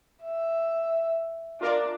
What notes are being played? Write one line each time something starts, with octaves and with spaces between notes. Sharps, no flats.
E5
D4 F4 A#4 D5